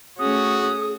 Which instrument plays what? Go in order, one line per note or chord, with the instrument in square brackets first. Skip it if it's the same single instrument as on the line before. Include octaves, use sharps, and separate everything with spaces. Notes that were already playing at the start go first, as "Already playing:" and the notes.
[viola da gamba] A3 C#4 [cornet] F#4 [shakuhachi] G#4 [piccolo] D#6